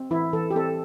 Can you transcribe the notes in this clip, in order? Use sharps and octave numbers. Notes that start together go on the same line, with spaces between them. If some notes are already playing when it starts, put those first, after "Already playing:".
Already playing: C4
E3 E4
E3 A4
G4
C4 A4